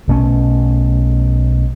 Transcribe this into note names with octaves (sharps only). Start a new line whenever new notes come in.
B1 B2 A3 C#4